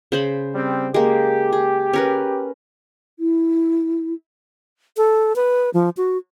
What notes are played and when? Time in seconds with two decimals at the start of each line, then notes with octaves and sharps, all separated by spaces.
0.12 C#3 C5 B5
0.55 G3 C4
0.94 G#3 A#3 G4
1.53 G#4
1.93 C#4 A#4 B4
3.19 E4
4.97 A4
5.36 B4
5.74 F3
5.97 F#4